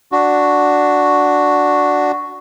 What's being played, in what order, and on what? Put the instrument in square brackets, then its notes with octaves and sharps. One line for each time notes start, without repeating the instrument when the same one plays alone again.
[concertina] D4 F#4